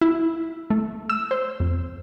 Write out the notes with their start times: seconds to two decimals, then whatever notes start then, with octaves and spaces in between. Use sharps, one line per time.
0.01 E4
0.70 A3
1.09 E6
1.31 C5
1.60 F2